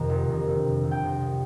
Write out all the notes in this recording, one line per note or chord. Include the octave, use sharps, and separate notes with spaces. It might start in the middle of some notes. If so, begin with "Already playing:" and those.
Already playing: F2 C3 D#3
F1
F2 C3 D#3
G1
F2 C3
G1
G5
F2 C3
G5
C2